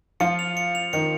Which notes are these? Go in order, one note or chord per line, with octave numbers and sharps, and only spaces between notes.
F3 F4 C#7
F7
C#7
F7
D#3 D#4 C#7